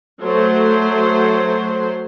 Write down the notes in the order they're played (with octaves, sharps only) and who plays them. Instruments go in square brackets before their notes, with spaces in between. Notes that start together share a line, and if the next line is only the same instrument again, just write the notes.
[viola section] F#3 A3 C5